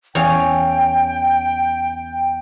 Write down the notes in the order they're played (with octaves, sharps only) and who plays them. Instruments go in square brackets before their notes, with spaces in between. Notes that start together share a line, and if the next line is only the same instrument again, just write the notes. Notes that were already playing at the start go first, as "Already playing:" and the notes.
[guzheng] E2 C#4 F5 [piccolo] G5